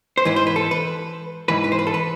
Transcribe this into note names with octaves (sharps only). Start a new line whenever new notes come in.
C5
G#2 E3 B4
C5
B4
A4
B4
G#2 E3 B4
B4
C5
B4
A4
B4